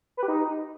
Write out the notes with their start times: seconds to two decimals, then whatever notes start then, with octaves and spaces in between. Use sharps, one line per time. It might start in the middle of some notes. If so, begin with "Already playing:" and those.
0.17 B4
0.23 G4
0.28 D#4